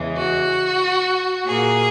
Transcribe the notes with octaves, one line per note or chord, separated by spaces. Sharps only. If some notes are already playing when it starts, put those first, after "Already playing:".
Already playing: E2 C#3 E3 G#3
F#4
A#2 A#3 G#4